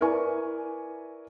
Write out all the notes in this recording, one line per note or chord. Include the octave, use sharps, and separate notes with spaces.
E4 A#4 B4 D5 G#5 C#6